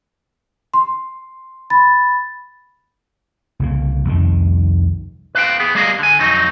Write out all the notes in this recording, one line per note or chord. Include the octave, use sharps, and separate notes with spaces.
C6
B5 A6
C2 C#3 A#3
C2 F2 D#3
B4 F5 G5
B3 G#4
G3 A#3 G4 G#4 D#5 F5
D3 G#5
F2 F#3 C4 D#4